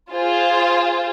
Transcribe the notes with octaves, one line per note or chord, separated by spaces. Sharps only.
F4 G#4 C5